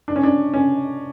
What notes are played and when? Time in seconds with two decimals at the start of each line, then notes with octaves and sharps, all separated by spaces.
0.08 D4
0.16 C#4
0.23 D4
0.54 C#4